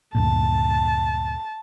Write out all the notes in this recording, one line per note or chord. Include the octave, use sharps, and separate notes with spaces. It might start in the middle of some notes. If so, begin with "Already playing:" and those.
D2 G2 A#2 A5